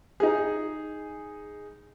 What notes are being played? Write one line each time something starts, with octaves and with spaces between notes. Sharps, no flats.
D#4 G#4